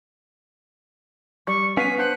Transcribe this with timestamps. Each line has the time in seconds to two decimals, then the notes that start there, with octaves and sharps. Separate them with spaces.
1.47 G3 C#6
1.77 B3 C#4 F5 G#5 B6
1.99 D4 C5 F#5 F#6